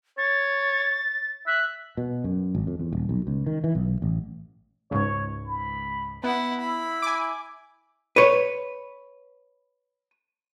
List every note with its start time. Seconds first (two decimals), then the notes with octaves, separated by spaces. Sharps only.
0.18 C#5 A6
1.47 E5 F#6
1.97 B2
2.24 F#2
2.55 G#1
2.67 F2
2.80 E2
2.93 D#1
3.09 B1
3.27 C#2
3.47 D#3
3.64 E3
3.75 B1
4.02 A1
4.91 C#2 G#2 C#5
5.46 B5
6.24 B3 E4 F#5
6.60 E4 B5
7.02 G#5 D6
8.16 B4 C#5